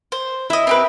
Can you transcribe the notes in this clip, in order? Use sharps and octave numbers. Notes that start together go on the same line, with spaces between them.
C5
E4 D#5 E5
C4 G4 B4